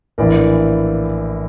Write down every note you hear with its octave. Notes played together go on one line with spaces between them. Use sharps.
A#1 A2 E3 A#4 D5